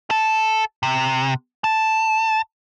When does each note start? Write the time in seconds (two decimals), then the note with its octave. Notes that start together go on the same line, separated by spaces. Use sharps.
0.10 A4 A5
0.83 C3
1.64 A5